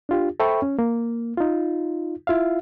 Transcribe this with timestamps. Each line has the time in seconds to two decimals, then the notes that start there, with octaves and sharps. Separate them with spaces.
0.09 D4 F4 G4
0.40 A4 C5 E5 G5 B5 C#6
0.62 C#4
0.79 A#3
1.37 D#4 F4
2.27 E4 F4 E5 F5